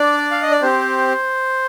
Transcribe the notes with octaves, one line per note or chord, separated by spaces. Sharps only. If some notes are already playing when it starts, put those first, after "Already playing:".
Already playing: D4 D5
F5
D#5
D5
C4 G4 C5